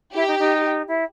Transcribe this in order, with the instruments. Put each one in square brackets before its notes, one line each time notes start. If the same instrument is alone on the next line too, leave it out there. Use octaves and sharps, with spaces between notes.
[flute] E4 [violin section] G4
[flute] D#4
D#4
E4